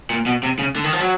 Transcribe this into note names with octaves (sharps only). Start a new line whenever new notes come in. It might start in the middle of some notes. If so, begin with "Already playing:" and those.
A#2
B2
C3
C#3
D3
D#3
F3
F#3